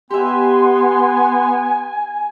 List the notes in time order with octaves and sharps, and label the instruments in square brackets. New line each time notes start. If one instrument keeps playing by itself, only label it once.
[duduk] B3 [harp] G4 E5 [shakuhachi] G#5 [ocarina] C6